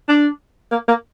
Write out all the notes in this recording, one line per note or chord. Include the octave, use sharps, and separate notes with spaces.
D4
A#3
A#3